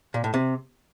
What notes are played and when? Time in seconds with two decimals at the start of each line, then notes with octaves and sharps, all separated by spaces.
0.14 A#2
0.24 A2
0.34 C3